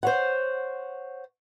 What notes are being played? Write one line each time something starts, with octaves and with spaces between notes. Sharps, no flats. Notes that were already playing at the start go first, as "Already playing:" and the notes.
C5 C#5 F#5